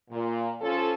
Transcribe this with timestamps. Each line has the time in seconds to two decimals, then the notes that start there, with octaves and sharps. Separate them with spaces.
0.10 A#2
0.61 F3 C#4 F4 A4